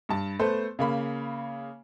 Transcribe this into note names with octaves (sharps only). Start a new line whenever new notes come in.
G2 A5
A3 B3 A4 C5
C#3 A#3 B5